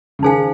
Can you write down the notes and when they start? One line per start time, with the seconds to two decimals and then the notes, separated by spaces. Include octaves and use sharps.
0.19 C#3
0.22 D#3 D#4 G#4 C5 F5 G#5